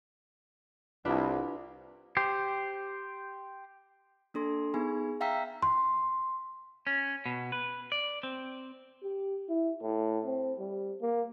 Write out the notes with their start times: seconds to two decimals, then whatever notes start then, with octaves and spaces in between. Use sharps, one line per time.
1.05 C2 D4 F4 B4
2.17 G4 C5
4.34 A#3 D4 A4 C6
4.74 B3 D#4 G#4 G#5 B5
5.21 E5 F5 G5 A#5 E6 B6
5.62 C6
6.87 C#4
7.26 B2
7.52 B4
7.92 D5
8.23 C4
9.03 G4
9.49 E4
9.81 A2
10.26 C4
10.59 G3
11.01 A#3